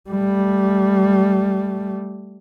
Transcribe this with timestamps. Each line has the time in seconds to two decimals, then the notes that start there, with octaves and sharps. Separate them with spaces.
0.10 G3 A3